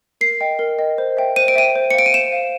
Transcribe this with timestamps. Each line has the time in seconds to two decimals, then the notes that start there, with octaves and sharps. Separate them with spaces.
0.21 A#4 C7
0.41 D#5 G5
0.59 A#4
0.79 D#5 G5
0.98 C5
1.17 E5 G5
1.36 C5 D#7
1.48 D7
1.55 E5 G5 D#7
1.76 C5
1.90 C#7
1.94 F5 D7
2.06 D#7
2.14 C5 E7
2.32 F5